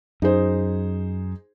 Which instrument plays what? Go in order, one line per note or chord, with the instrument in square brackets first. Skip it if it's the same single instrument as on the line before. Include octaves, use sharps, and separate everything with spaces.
[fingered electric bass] F#2 [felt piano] D#4 G#4 C5